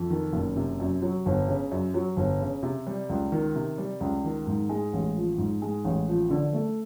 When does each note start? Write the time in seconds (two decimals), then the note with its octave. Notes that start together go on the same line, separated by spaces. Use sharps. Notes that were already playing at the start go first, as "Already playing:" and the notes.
Already playing: F2
0.10 D#3
0.33 F#1
0.56 C3
0.80 F#2
1.02 F#3
1.26 G1
1.48 C#3
1.71 F#2
1.94 F#3
2.17 G1
2.41 C#3
2.63 C3
2.87 G3
3.09 C#2
3.32 D#3
3.55 C3
3.78 G3
4.01 C#2
4.24 D#3
4.47 G#2
4.69 G#3
4.93 A1
5.16 F3
5.38 G#2
5.62 G#3
5.84 A1
6.08 F3
6.30 D3
6.53 A3